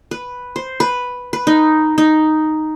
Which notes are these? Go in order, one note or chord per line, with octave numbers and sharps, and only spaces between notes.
B4
C5
B4
B4
D#4
D#4